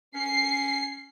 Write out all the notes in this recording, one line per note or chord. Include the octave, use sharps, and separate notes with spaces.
C#4 C7